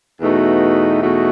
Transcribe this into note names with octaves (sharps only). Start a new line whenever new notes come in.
E2 B2 A3 D#4 F#4
E2 B2 A3 D#4 F#4